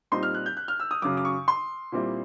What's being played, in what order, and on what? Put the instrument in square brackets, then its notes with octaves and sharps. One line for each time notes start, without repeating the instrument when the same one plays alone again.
[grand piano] A#2 G3 C4 D#4 C6
F6
F#6
G6
F#6
F6
E6
D#6
F#2 C#3 F#3 D6
D6
C#6
C6
A#2 G3 C4 E4